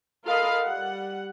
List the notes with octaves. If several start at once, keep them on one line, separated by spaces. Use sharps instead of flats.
F4 A4 A#4 D#5 F5 B5
G3 F#5